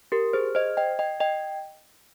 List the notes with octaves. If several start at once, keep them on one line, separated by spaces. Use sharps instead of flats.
G4 A#4
G#4 C5
C5 D#5
D#5 G5
D#5 G5
D#5 G5